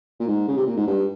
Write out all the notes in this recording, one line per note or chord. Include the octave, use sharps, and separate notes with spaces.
A#2
G#2
C#3
C3
A#2
G#2
G2